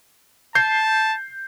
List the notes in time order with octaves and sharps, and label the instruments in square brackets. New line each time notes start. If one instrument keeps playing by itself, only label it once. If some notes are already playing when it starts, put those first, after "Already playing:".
[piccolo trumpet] A5 [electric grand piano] G6 C7